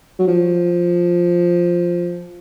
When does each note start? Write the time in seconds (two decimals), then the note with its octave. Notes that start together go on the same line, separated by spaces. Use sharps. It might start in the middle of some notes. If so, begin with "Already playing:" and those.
0.19 F#3
0.28 F3